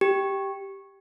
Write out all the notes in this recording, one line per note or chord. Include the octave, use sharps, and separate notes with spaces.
G4